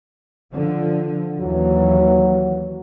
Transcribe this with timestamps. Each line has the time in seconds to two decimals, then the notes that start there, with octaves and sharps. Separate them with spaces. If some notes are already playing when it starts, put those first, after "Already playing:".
0.52 D3 F3
1.38 D#2 E3 F#3